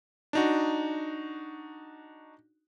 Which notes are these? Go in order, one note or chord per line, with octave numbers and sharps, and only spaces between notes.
D4 D#4 F#4